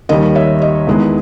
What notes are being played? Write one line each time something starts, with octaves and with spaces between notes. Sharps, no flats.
D#2 D#3 G3 D#5
C#5 E5
D#5
E2 D#3 G#3 B3 E4